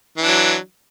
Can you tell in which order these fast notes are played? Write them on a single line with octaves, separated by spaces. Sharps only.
E3 D4 F#3